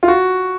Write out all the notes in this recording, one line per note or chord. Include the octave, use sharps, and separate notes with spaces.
F4
F#4